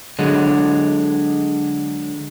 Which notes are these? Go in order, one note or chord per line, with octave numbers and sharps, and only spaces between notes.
D3 F#3 G#3